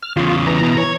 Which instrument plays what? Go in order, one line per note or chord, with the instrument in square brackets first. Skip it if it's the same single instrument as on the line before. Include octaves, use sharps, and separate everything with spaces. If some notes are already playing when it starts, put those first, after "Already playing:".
[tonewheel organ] F6
[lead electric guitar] E2 C#3 [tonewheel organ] F4
[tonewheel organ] E3 A#5
[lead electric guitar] B2
C#5